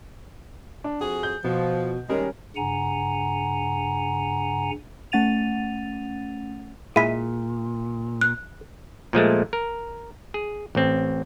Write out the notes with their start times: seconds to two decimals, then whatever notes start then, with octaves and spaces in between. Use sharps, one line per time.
0.84 D4
1.01 F2 F#4 G#4 G#5
1.23 G6
1.44 B2 F3
2.09 D#3 G3 G#3 C#4 A#4
2.56 G2 C#3 F#5 G#5 A#5
5.12 A3 C#4 F#5 A6 D#7 F7
6.96 A#2 G#3 E4 B6 D#7
8.21 F#6
9.13 A#2 F3 G#3 A3
9.53 A#4
10.34 G#4
10.75 A1 C4